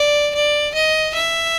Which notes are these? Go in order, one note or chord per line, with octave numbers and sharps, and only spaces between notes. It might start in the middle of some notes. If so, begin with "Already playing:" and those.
Already playing: D5
D5
D#5
E5